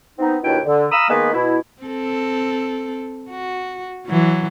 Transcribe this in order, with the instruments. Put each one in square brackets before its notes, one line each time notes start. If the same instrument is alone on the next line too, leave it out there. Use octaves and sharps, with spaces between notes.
[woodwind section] B3 C4 D#4
D#2 B2 D4 E4 G5
D3
F5 A#5 B5 D#6 E6
D#3 G#3 A#3 B3 B4
B2 E4
[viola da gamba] C4 A4
F#4
E3 F#3